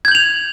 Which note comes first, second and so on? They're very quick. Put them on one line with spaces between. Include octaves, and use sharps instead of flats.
G#6 G6 F#7 F7